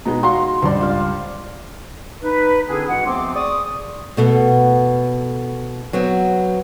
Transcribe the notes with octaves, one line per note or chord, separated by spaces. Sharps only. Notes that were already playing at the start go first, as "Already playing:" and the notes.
B2 G#3 B3 D#4
F#4 F5 A#5 C6
C#2 G2 C5 D5 C6
F4 F5
D#4 B4
D3 C4 D4 E4 G#4
G2 E3 G#3 F#4 F#5
D2 F3 B3 C4 C6 D6
G#4 D5 C#6 D#6
B2 A3 B3
F#3 B3 C4